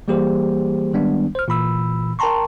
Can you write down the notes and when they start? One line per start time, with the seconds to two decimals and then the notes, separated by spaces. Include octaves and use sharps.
0.08 E3 G3 A#3 G4 G#4 C5
0.93 D#3 G3 G#3 B3 D4
1.35 C5 F6
1.48 A#2 E3 B5 E6
2.19 A#4 G5 A5 A#5 C6 C#6